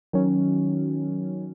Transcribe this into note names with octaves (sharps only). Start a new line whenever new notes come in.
D#3 F#3 C#4